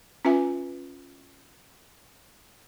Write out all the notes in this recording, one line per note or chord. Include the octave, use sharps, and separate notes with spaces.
C#4 F4 B4 E5 G#5